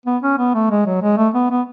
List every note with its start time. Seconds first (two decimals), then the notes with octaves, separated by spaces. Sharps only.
0.06 B3
0.23 C#4
0.38 B3
0.54 A3
0.70 G#3
0.86 F#3
1.02 G#3
1.17 A3
1.34 B3
1.50 B3